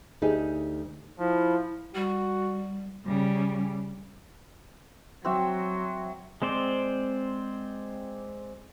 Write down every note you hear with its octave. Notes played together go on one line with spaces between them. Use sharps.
D2 D#4 G4 G#4
F3 E4
G3 F#4
C#3 G3
F#3 C4 F#4 E5
G#3 C4 C5 D5